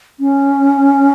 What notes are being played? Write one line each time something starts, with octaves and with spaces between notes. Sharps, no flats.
C#4